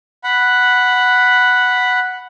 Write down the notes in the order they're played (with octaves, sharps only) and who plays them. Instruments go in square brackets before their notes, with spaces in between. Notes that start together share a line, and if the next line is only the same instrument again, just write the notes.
[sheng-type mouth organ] F#5 B5